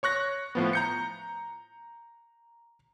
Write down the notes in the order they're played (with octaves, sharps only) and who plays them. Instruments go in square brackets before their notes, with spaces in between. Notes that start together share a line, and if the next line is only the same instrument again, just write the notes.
[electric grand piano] C#5 C#6 F#6 A#6
A2 F3 B3
A#5 G6 C#7